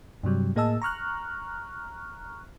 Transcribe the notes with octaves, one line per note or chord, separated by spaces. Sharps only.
G2 C3 F#3 G3
A2 A#3 G#4 D#5 A5 E6
A#5 C#6 F6 F#6